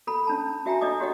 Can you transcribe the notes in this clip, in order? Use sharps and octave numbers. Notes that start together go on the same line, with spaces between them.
A4 A#5 B5
C#4 D4 A5
F#4 E5 G5 G#5 A#5
D4 A4 D#5 D6 D#6
F#4 G4 C#5 D#5 F#5